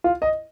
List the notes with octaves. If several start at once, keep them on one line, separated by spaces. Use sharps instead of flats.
F4
D#5